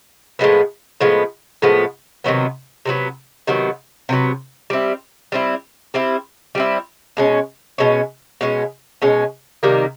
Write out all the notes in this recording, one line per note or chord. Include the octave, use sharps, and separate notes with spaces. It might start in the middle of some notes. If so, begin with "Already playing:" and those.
A2 F3 G#3 B3
A2 F3 G#3 B3
A2 F3 G#3 B3
C3 D#3 F#3 B3
C3 D#3 F#3 B3
C3 D#3 F#3 B3
C3 D#3 F#3 B3
G3 C4 E4
G3 C4 E4
G3 C4 E4
G3 C4 E4
B2 G#3 C#4
B2 G#3 C#4
B2 G#3 C#4
B2 G#3 C#4
C3 D#3 G3 A#3